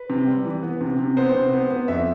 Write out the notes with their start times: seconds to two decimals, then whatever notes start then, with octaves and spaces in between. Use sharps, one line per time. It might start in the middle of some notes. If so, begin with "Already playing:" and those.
Already playing: B4
0.10 C3
0.27 G3
0.45 E3
0.63 B3
0.81 C3
0.99 C3
1.17 B3 C5
1.35 C3
1.53 B3
1.71 B3
1.88 F2 E5